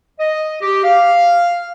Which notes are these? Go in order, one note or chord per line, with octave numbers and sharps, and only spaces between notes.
D#5
G4
F5